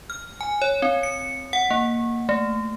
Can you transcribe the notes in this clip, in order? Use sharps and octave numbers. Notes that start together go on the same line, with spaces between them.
F6
G#5
C#5
C4
C#7
F#5
A#3
A3